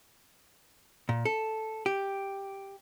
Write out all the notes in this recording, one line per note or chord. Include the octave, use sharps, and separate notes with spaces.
A#2
A4
G4